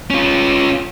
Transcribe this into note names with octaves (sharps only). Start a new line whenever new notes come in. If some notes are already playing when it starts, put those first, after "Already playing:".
C#4 F4